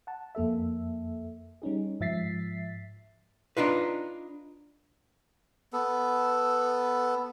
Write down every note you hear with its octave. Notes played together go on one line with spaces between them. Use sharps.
F#5 A5
F2 A#3 A4 E5
G3 C#4 D#4 G#4
G#2 F3 E5 A6 B6 C7
D4 D#4 F4 B4
B3 A4